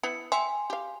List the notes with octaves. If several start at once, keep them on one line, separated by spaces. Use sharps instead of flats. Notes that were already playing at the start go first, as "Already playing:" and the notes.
B3 E4 C#7
E5 G5 G#5 C6
G4 F5